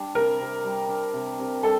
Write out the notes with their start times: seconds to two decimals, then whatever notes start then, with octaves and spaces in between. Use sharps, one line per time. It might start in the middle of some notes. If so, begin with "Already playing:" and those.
Already playing: G3 D4
0.15 C3 A#4
0.41 C3
0.64 G3
0.89 D4
1.13 C3
1.39 C3
1.63 G3 A4